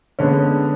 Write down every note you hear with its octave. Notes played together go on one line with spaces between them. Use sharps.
D3 G#3 B3 C#4